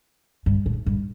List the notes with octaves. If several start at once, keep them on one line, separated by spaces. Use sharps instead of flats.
G2
A2
G2